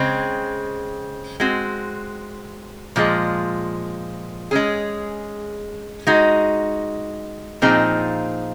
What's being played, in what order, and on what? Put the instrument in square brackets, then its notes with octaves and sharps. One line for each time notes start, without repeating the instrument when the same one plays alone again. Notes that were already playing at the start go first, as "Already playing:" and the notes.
Already playing: [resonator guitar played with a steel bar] C#3 G#3 C4
G#3 C4 F#4
A#2 F3 G#3
G#3 C#4 G#4
G#3 D#4 F#4
A#2 F3 C4 D#4 G#4